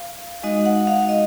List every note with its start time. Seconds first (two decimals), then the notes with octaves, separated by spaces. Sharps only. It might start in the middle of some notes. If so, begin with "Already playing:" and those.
Already playing: F5
0.43 G#3 D#4 F#4 D#5
0.66 F#5
0.87 F5
1.09 D#5